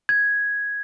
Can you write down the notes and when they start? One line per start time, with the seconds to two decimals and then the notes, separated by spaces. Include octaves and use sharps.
0.09 G#6